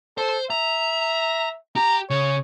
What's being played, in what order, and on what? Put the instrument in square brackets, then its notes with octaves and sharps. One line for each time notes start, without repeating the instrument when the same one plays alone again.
[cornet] A4 [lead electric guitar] C5
[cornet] E5 [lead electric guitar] A#5
[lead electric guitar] G4 [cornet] A#5
[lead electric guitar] C#3 [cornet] C#5